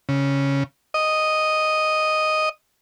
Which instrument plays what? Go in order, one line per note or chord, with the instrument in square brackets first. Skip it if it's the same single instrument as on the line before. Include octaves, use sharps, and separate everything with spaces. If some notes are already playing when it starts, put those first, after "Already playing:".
[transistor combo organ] C#3
D#5